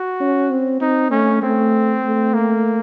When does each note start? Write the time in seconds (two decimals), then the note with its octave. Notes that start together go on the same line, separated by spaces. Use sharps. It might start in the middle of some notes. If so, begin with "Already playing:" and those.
Already playing: F#4
0.20 C#4
0.51 C4
0.81 C4 D#4
1.11 A3 C#4
1.42 A3 C4
2.04 A3
2.34 A#3